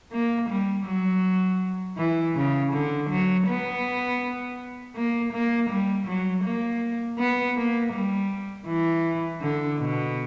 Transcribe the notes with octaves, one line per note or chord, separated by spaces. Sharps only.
A#3
G3
F#3
E3
C#3
D3
F#3
B3
A#3
A#3
G3
F#3
A#3
B3
A#3
G3
E3
D3
B2